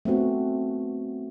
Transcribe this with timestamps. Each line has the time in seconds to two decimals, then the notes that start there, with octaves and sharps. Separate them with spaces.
0.05 A3 B3 C4 F#4